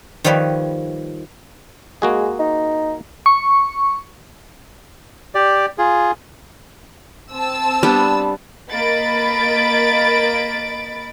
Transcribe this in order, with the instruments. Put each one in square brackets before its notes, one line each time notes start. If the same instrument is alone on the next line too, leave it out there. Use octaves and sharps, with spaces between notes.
[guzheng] D#3 F3 G3 B4 C#5
[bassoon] G#3 [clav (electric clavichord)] A#3 F#4 G#4
[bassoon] D#4
[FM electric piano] C#6
[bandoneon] G4 D5
F4 G#4
[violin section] C4 A5 E6
[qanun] G3 B3 D4
[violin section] A#3 D#5 B5 A6 D7